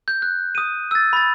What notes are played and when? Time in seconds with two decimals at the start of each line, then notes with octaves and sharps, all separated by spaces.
0.08 G6
0.22 F#6
0.55 D#6 D#7
0.91 E6 A6
1.13 B5 A6